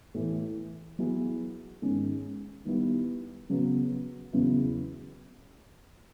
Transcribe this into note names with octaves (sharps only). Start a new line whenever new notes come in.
A2 E3 A3
F#3 B3 E4 G#4
G#2 D#3 G#3 C#4
D#3 G3 B3 E4
C#3 F#3 B3
E2 C#3 F#3 B3 E4